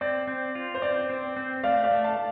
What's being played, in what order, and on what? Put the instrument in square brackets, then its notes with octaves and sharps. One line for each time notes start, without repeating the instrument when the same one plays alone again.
[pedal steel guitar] C4 [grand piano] D5
[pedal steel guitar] C4
F4
[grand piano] C5
[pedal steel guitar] C4 [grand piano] D5
[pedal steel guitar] C4
C4
[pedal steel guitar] A3 [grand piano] D5 F5
[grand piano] D5 F5
[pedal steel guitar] A3
[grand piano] F5 A5